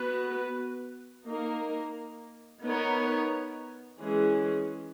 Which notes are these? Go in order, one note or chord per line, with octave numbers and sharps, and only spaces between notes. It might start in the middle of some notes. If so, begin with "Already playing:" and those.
Already playing: B3 F#4 B4
A#3 D#4 A#4
B3 D#4 A#4 C#5
E3 G#3 C#4 G#4